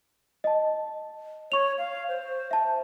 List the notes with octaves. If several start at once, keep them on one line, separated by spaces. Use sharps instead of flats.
D#5 A5
C#5 C#6 F7
F5
C5
E5 A5